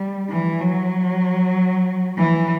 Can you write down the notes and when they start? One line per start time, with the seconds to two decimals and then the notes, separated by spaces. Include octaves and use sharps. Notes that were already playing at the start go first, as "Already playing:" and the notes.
Already playing: G3
0.30 E3
0.61 F#3
2.18 E3